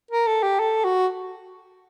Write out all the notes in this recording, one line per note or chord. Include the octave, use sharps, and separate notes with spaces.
A#4
A4
G4
A4
F#4